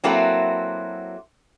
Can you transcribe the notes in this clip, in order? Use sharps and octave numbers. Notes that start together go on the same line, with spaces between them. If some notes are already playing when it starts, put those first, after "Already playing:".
F#3 A#3 C4 E4 F#4 A4